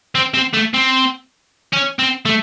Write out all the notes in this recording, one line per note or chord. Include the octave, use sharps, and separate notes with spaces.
C4
C4
A3
C4
C#4
C4
A3